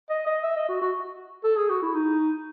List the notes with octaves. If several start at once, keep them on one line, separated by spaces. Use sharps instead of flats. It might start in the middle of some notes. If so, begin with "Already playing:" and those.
D#5
D#5
E5
D#5
F#4
F#4
A4
G#4
F#4
E4
D#4